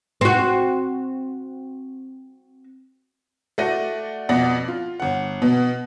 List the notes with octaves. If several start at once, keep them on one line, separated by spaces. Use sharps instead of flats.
C4 F#4
A3 F#4 D5 A#6 D#7
F2 B2 D5 F#5 A#6
F4
G1 F#5
B2 B3